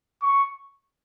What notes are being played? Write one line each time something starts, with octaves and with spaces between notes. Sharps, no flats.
C#6